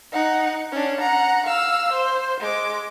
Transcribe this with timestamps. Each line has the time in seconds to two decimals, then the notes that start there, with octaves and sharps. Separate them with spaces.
0.12 D#4 F#5
0.72 C#4 D4
1.00 F#5 A#5
1.46 F5 E6
1.92 C5
2.40 G#3 D6